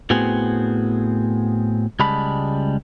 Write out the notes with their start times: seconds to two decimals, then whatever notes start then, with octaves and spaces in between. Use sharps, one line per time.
0.10 A2 B3 C4 F#4 G#4
1.99 C#2 G3 G#3 A5 B5